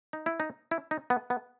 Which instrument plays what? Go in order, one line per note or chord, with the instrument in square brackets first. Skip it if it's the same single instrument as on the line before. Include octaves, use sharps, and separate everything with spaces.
[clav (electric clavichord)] D#4
E4
D#4
E4
D#4
B3
B3